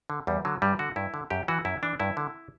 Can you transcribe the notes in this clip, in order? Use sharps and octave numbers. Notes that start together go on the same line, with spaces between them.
D3
E2 G3
D3 F#3
G2 G3
D3 F#4
G2 E4
D3
F#2 G4
E3 F#4
F#2 E4
E3 D4
G2 E4
D3